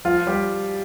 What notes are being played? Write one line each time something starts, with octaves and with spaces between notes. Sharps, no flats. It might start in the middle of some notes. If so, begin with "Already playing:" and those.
F3 F4
G3 G4